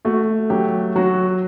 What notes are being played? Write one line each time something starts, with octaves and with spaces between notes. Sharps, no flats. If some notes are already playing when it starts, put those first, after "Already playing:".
A3 F#4
F#3 G4
F#3 F#4